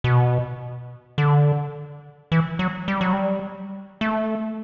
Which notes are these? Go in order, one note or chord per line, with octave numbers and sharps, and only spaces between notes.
B2
D3
E3
F#3
G3
F#3
G3
A3